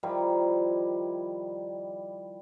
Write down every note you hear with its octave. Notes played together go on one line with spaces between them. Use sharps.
D#3 F3 G3 E4